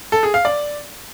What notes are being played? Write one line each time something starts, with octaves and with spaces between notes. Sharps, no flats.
A4
G#4
F5
D5